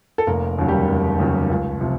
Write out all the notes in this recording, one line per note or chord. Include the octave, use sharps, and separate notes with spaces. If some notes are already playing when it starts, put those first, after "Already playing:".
A4
F1 A#3 A#4
D#2 C#3 F#3
G3 G4
F1
D#2 C#3 F#3
C#2
C3 F3